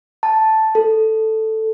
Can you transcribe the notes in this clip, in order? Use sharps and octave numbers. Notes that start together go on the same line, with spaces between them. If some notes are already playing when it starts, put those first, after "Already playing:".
A5
A4